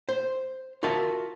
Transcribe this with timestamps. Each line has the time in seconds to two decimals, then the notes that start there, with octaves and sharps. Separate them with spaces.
0.09 C5
0.83 F4 F#4 A#4 E5 A5